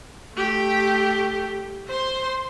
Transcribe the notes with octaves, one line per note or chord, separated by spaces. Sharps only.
A3 G4
C5 C6